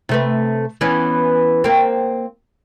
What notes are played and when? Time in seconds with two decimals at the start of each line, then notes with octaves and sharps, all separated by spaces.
0.09 C3 A3 B4
0.81 E3 B3 C#4
1.64 A#3 C4